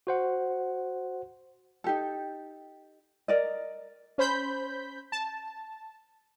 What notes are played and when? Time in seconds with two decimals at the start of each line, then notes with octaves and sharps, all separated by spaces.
0.07 F#4 C5 F#5
1.84 D#4 G4 A4
3.28 A#4 D5 D#5
4.18 C#4 C5 B5 G6 B6
5.12 A5